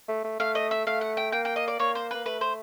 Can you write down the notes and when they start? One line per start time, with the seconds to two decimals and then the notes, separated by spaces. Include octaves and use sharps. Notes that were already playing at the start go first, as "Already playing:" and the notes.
0.08 A3
0.24 A3
0.40 A3 F5
0.55 D#5
0.71 E5
0.87 A3 F5
1.01 F#5
1.17 G5
1.32 A#3 G5
1.45 G5
1.56 D#5
1.68 D5
1.80 A#3 C#5
1.95 C5
2.11 A#3 B4
2.26 A3 B4
2.41 C5